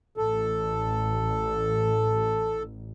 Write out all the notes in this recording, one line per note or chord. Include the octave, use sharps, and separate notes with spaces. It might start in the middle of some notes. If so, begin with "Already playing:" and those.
A1 A4